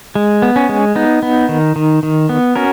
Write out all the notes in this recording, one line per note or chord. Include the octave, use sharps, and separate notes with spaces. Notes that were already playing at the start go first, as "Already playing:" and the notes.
G#3
B3
C#4
G#3
B3 D#4
B3
D#3
D#3
D#3
B3
C#4 F#4 A#4